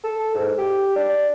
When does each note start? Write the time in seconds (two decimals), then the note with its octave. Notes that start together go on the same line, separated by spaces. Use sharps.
0.04 A4
0.35 G#2
0.58 G4
0.96 D4